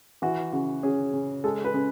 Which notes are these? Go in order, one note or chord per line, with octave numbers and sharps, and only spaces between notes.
E3 F#4
C#3 F#4
C#4 G#4
C#3
G#3 A4
B4
C#3